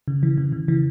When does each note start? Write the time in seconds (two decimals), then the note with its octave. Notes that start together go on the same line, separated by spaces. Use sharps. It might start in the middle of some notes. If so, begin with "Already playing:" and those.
0.08 C#3
0.23 E3
0.38 C#3
0.52 C#3
0.68 E3